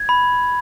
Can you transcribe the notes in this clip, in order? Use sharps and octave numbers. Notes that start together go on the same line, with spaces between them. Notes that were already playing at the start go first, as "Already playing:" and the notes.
Already playing: G#6
B5